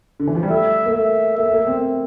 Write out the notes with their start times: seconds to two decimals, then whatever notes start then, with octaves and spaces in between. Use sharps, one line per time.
0.20 D3
0.27 E3
0.35 F3
0.43 G3
0.50 A3 E5
0.86 A#3
0.94 A3 E5
1.38 A#3 E5
1.46 A3
1.53 A#3
1.67 C4